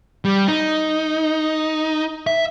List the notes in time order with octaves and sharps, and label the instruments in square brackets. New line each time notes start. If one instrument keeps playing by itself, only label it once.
[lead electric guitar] G3
D#4
E5